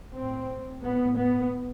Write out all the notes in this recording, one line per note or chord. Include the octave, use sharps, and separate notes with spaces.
A2 C4
A2 B3
B3